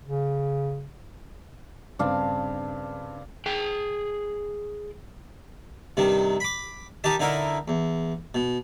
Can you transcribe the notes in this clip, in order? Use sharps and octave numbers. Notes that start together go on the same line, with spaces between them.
C#3
G2 C#3 C4 D4 F5
G#4 G5
G2 C3 D#3
B5 D6
D#3 D#4 G4 A5
D3 D#4 E4 A#4
E2
B2